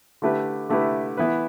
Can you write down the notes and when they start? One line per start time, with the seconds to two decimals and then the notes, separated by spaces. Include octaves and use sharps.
0.22 D3 A3 E4 G4 B4
0.70 D3 A3 E4 G4 B4
1.17 E3 B3 E4 B4